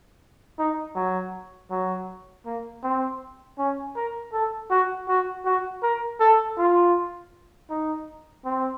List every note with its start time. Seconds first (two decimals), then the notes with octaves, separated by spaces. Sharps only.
0.59 D#4
0.95 F#3
1.71 F#3
2.46 A#3
2.84 C4
3.58 C#4
3.96 A#4
4.33 A4
4.70 F#4
5.08 F#4
5.45 F#4
5.83 A#4
6.20 A4
6.58 F4
7.70 D#4
8.45 C4